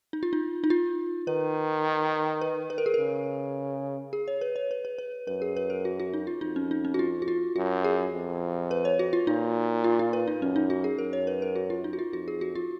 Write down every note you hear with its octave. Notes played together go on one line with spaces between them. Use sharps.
D#4
F4
D#4
D#4
F4
D#3 B4
B4
B4
A#4
G#4
C#3 A#4
G#4
C#5
B4
C#5
B4
B4
B4
F#2 B4
G#4
B4
A#4
F#4
F#4
D#4
F4
F2 D#4
C#4
D#4
C#4
F#4
F4
F#4
F4
F#2 F#4
G#4
F2
B4
C#5
F#4
F4
A#2 D#4
F4
F4
B4
D#4
F#2 C#4
D#4
F#4
G#4
F#2 A#4
C#5
B4
A#4
F#4
F4
D#4
F#4
F4
F2 F#4
G#4
F#4
F4